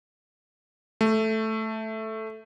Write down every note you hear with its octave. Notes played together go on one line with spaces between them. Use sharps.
A3